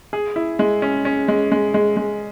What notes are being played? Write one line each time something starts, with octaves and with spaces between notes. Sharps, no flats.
G#4
E4
G#3
C#4
C#4
G#3
G#3
G#3
G#3